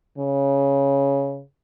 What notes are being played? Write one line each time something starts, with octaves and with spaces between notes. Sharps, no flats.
C#3